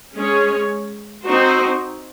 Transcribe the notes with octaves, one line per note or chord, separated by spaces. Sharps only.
G#3 C#4 G#4 C#5
C4 D#4 F#4 C5